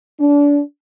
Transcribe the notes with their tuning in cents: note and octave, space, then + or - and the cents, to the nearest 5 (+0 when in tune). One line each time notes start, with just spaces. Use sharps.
D4 -30